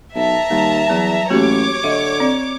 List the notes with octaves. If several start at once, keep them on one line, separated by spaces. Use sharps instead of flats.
B1 E5 A5 A#5
D#2 G3
E2 F#3
A1 A#3 F#4 G4 C#5 D6
D3 D#5 E5
C4 D5